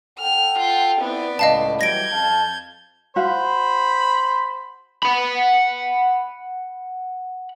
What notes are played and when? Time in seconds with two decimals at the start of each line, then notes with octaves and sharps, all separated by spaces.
0.19 A4 F#5 G5 F6
0.59 F4
1.02 B3 C4 E4 B4 D5
1.39 C#2 A2 D#5 F5 A5
1.81 E3 F#3 G3 G6 G#6 A#6 D7
2.12 F2 F5 A5
3.16 F#4 C5 F5 B5
5.03 F#5 B5